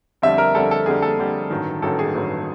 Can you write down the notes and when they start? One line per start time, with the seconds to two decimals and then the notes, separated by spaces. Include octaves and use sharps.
0.22 F2 D3 G3 E5
0.38 A#4
0.55 F2 D3 G3 A4
0.71 A4
0.86 F2 D3 G3 G#4
1.02 A4
1.19 F2 D3 G3
1.50 A1 G2 D#3 F#3
1.82 A1 G2 D#3 F#3 A4
1.99 G#4
2.14 A1 G2 D#3 F#3